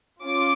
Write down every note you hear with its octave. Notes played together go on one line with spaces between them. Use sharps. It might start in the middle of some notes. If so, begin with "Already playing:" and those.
C#4 F4 D6